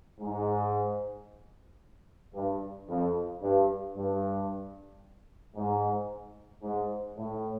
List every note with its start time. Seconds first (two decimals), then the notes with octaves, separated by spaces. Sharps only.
0.20 G#2
2.34 G2
2.88 F2
3.41 G2
3.95 G2
5.55 G#2
6.62 G#2
7.16 A2